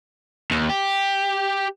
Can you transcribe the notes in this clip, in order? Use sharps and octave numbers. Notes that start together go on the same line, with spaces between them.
D#2
G4